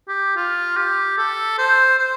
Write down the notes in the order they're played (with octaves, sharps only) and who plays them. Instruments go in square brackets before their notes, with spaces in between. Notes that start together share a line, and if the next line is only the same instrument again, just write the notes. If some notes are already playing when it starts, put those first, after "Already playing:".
[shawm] G4
F4
G4
A4
C5
C5